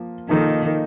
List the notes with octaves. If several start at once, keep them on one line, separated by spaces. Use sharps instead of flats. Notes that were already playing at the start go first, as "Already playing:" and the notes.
Already playing: F3 A#3
D#3 F3 A#3 D#4 A4